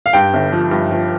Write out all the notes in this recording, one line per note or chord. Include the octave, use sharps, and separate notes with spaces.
F5
G2 G5
G1
F3
G2
F3